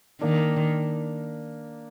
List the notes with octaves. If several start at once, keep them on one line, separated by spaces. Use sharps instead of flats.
D#3 A#3 D4